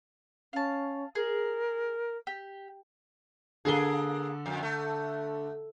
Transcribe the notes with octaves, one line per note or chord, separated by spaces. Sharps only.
C#4 F5 A5
G#4 A#4
G4
D3 A#3 G#4 A4 G7
F2
A3